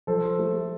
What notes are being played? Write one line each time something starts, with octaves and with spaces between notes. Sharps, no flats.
F3 A4 C5
A3